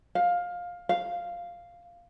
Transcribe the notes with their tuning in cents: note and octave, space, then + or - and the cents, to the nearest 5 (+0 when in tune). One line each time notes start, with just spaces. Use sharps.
F5 +15
F5 -5